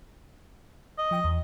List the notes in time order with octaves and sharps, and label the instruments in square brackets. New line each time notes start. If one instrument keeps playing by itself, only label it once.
[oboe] D#5
[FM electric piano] F3 G5 D#6
E2